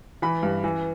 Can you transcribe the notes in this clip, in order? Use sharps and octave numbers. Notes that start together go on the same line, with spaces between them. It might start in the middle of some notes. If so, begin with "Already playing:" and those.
E3 B5
G2
E3